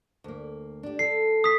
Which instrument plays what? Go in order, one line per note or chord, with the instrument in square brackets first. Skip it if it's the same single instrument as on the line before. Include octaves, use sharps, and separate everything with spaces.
[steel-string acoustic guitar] D2 A#3
D4 G4
[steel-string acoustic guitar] A4 [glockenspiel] C7
[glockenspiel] D#6 B6